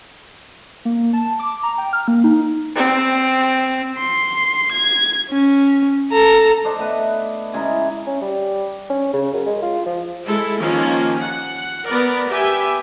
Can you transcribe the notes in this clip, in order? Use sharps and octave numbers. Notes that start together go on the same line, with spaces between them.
A#3
A5
D6
A#5
G5
F6
A#3
D#4
C4
C6
G#6
C#4
A4 A#5
D4 C5 D#5
A3 B3 B4
C#3 G#3 E4 A#5
C#4
G3
C#4
C#3
F#2
G#3
F4
F3
G#3 E4 A4
D#3 F3 A#3 C#4 F4
F#5
B3 A#4 D5
B3 G4 E5 G#5